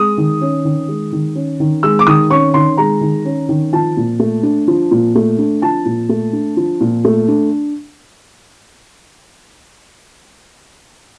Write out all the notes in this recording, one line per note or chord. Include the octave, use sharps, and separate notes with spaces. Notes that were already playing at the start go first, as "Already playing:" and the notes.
Already playing: G#3 D#6
D#3
C#4
D#3
G#3
D#3
C#4
D#3
G#3 E6
D6
D#3 D#6
C#4 C#6
D#3 C6
G#3 A#5
D#3
C#4
D#3
F3 A5
A#2
A3
D4
F3
A#2
A3
D4
F3 A5
A#2
A3
D4
F3
A#2
A3
D4